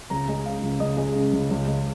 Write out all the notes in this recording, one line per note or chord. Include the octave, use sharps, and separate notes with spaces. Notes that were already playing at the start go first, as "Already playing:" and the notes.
C#2 A#5
G#3
C#3 F5
C#2
C#2 D#5
G#3
C#3
C#2
C#2
G#3